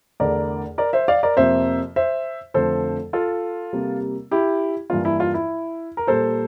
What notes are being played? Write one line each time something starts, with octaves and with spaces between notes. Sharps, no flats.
E2 D3 A3 A#4 D5
A#4 D5
C5 E5
D5 F5
A#4 D5
F2 C3 F3 A#3 C5 E5
C5 E5
F2 D3 F3 A3 A4 C5
F4 A4
C3 G3 A#3
E4 G4
G2 E3 A#3 F4
E4
F4
E4
A#4
A#2 G3 A#3 A4 C5